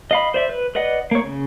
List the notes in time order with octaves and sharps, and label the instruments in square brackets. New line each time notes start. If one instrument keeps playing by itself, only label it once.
[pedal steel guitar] D#5 F5 B5
C5 D5 E5
B4
B4 D5 D#5 F#5
A#3 C#5
C#3